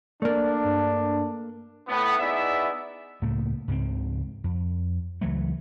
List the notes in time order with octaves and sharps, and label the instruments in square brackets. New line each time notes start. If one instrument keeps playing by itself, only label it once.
[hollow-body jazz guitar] A3 A#3 [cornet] D4 [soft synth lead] D5
[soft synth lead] G2
[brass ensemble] A2 B3
B3 D#4 E4 G#4 D5 E5
[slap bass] C#2 A2 A3 A#3
C#2 G#2 C#3 C4
F2
C#2 E3 F#3 A3